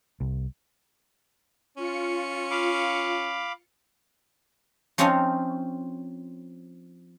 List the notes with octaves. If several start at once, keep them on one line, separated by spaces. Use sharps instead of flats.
C2
C#4 F4 C#7
F5 B5 D6
F3 C4 C#4 D#4 F4 C#5